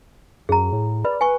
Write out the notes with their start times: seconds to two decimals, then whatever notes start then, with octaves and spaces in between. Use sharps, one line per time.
0.49 F#2 G#4 A#5
0.72 A2
1.04 B4 D5 B5
1.21 B4 G#5 C#6